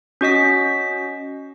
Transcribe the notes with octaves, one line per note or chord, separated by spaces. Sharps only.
C#4 F#4 D#5 B6